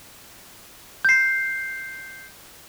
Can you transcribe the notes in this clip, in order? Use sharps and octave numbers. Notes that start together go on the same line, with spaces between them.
G6 C7